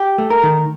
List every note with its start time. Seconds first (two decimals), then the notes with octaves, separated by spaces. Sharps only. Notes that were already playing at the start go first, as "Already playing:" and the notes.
Already playing: G4
0.18 A3
0.30 A#4
0.43 D#3